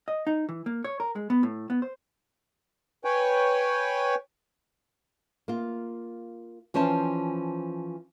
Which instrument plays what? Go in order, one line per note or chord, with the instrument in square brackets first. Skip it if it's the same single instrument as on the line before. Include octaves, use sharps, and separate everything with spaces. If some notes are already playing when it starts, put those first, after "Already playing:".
[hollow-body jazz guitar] D#5
D#4
E3
A#3
C#5
A#4
G#3
B3
A2
B3
C5
[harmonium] B4 C#5 G5 G#5
[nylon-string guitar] A#3 F4
E3 F3 C#4 C5 A5